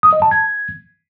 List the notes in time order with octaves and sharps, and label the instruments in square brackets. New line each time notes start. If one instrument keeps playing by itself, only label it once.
[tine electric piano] D#6
D#5
A5
G#6